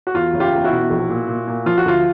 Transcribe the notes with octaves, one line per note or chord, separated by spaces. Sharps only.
F#4
E2 F4
F#1
F4 G4
E2
E4 F#4
B2
A#1
A#2
A#2
A#2
F3 F4
F#4
D2 F4